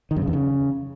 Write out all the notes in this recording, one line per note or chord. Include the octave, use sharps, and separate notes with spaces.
D#3
F#2
C#3
E2
C#3